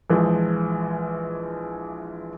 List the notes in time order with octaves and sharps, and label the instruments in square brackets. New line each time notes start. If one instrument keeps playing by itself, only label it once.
[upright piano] A#1 E3 F3 G#3